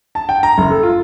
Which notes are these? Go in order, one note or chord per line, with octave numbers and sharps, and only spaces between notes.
A5
G5
A#5
F#1
A4
F4